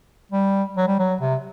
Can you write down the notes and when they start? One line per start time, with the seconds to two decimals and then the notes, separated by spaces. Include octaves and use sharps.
0.32 G3
0.77 F#3
0.87 G3
0.99 F#3
1.21 C3